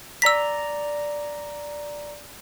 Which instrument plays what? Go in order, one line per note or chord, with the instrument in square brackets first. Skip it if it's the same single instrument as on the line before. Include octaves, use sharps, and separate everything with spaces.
[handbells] D5 A#5 A#6 [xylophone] E6 B6